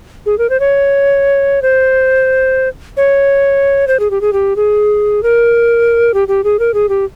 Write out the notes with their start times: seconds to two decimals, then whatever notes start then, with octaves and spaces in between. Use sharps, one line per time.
0.26 G#4
0.38 A#4
0.50 C5
0.60 C#5
1.62 C5
2.97 C#5
3.88 C5
4.00 G#4
4.11 G4
4.21 G#4
4.33 G4
4.56 G#4
5.23 A#4
6.14 G4
6.28 G4
6.44 G#4
6.59 A#4
6.74 G#4
6.89 G4